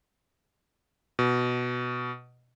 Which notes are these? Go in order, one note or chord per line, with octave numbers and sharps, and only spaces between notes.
B2